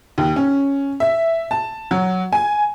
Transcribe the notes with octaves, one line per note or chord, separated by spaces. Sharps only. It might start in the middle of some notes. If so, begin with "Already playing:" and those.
D#2
C#4
E5
A5
F#3
G#5